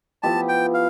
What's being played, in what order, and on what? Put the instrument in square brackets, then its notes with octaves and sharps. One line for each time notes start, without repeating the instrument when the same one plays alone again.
[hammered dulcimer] F3 B3 E4 G4 [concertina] A5
[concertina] G5
F5